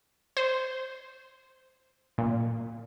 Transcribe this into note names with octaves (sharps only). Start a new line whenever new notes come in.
C5
A#2